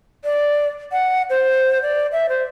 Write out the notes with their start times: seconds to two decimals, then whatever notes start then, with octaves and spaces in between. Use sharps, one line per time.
0.24 D5
0.92 F#5
1.30 C5
1.82 D5
2.12 E5
2.29 C5